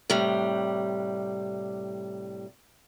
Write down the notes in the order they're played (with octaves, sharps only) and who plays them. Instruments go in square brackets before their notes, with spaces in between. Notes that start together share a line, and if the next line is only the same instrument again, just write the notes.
[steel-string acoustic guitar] A2 C3 G3